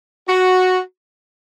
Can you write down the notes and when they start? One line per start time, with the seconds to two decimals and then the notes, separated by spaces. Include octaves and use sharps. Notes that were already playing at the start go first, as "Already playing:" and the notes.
0.27 F#4